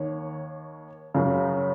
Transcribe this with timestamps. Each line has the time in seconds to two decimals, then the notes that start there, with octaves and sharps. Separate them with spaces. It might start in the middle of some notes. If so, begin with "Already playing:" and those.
Already playing: D#2 D#3 C#5
1.14 F#2 C#3